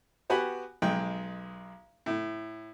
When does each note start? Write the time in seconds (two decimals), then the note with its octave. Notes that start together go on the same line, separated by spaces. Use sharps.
0.30 B3 F#4 G4 G#5 B5
0.82 B1 G#3 G5
2.06 A2